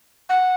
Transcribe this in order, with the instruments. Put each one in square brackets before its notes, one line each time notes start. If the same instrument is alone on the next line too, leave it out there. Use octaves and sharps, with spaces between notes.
[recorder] F#5